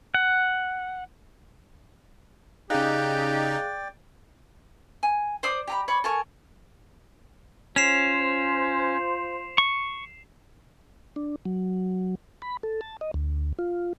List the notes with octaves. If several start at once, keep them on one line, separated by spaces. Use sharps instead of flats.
F#5
C#3 D#4 G4 G#4 D5 F5 G5 F#6
G#5
C5 D5 D#6
G4 A#5 B5
C#5 D5 B5
A4 A#4 G#5 C#6
C#4 F4 C5 C7 E7 F7
C#6
D4
F#3
B5
A4
A5
D#5
D2
F4